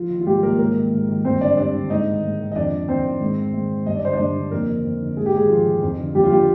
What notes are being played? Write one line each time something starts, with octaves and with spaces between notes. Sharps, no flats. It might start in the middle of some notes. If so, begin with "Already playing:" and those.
Already playing: F3 F4
D#3
F4
G#2 G3 G4
D#3 A#3 A#4
G#2 A#3 A#4
D#3
G#2
D#3
G2 C4 C5
D3 D4 D5
G2 D4 D5
D3
G#2 D#4 D#5
D#3
G#2
D#3
D#5
F2 D4 D5
D#3
F2 C4 C5
D#3
G#2
D#3
G#2
D#3
G2 D#5
D5
D3 C5
D4 D5
G2
D3
F2 A#3 A#4
D3
F2
D3
G#2 G#4
G4
D#3 G#3 G#4
G#2 F3 F4
D#3
F2
D3
F2 G3 G4
F4
D3 G3 G4